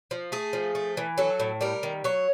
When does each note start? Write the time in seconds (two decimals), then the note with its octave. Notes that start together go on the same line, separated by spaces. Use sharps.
0.11 F3
0.32 A3 G#4
0.53 F3
0.75 A3
0.97 E3
1.18 F#3 A4
1.40 A2
1.61 G3 A#4
1.83 D#3
2.04 F#3 C#5